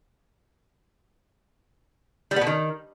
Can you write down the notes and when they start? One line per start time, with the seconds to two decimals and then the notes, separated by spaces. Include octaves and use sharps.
2.31 G3
2.36 B3
2.41 B2
2.47 D#3